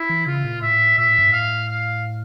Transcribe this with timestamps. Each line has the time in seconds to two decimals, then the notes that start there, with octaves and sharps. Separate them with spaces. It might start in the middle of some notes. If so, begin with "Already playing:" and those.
Already playing: E4
0.09 E3
0.26 C#3 F4
0.44 A#2
0.62 A2 E5
0.98 A#2 E5
1.08 A2
1.18 G2
1.28 A2 F5
1.68 F5